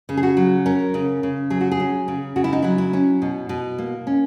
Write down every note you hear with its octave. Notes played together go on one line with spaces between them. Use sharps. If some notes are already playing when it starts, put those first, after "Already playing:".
C#3
G#4
F#4
F#3
C#4 A#4
C#3
C#3
F#3 G#4
F#4
G#4
C#4
C#3
C#3 F#4
E4
D#4
F#3 E4
E4
C#4
B2
B2
A#3
C#4